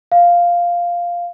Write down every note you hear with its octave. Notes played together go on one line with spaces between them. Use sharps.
F5